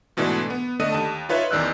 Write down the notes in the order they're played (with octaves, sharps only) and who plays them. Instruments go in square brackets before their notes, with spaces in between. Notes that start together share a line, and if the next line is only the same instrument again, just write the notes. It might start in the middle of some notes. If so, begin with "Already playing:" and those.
[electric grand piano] G#2 B2 E3 A3 D4
B3
D3 A3 D4 D#5 D#6 D#7
D#2 A5
D#4 F4 B4 C#5 E5
A1 E2 D#3 D5 E6 F#6